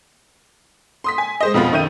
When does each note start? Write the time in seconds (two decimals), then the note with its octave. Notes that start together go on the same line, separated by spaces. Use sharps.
1.04 C6 D#6 B6
1.18 G#5
1.41 G#3 C5 D#5
1.54 F2 B2 B3 F4
1.72 F#2 D#3 E5 G6 D#7